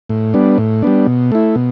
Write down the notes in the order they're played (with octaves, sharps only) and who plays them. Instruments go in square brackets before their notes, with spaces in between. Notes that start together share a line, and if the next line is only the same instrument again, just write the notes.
[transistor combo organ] A2
G3 B3 D4
A2
G3 B3 D4
B2
A3 E4
B2